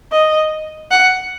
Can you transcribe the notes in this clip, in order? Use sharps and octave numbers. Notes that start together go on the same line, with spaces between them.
D#5
F#5